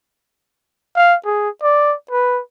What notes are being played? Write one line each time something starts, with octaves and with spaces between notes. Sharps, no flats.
F5
G#4
D5
B4